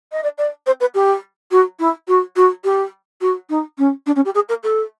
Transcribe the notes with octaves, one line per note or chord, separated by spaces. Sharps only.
D#5
D5
D5
C5
B4
G4
F#4
E4
F#4
F#4
G4
F#4
D#4
C#4
D4
C#4
G4
G#4
A#4
A4